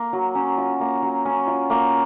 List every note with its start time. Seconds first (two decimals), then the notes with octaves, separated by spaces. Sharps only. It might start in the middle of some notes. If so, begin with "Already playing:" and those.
Already playing: A#3
0.13 F#3
0.35 C#4
0.58 F4
0.80 A#3
1.02 F#3
1.25 C#4
1.47 F4
1.70 A#3